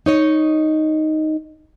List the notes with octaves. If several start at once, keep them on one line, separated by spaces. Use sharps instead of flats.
D#4 C#5 D#5